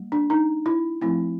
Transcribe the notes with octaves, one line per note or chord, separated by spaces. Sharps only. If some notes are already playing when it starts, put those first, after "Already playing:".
Already playing: G3 A#3
D4
D#4
E4
F3 A3 C4 E4